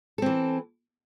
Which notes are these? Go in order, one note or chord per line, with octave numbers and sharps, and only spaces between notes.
E3 C4 A4